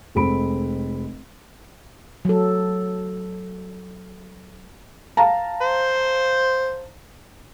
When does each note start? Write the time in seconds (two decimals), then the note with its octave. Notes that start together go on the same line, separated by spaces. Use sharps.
0.15 F1 G#3 C4 A4 B5 D7
2.25 F#3 A4
5.17 F5 A5 A#5
5.62 C5